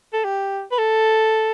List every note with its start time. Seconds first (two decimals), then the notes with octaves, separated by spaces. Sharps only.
0.13 A4
0.25 G4
0.72 B4
0.78 A4